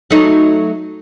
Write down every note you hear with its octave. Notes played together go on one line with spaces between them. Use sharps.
F#3 A3 D#4